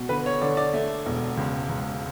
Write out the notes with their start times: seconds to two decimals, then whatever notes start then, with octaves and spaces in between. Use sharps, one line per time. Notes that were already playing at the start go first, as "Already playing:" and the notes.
Already playing: B2
0.09 D3 B4
0.26 C#5
0.41 D3 D5
0.57 D5
0.74 A3
1.06 E1
1.37 C#2
1.69 C#2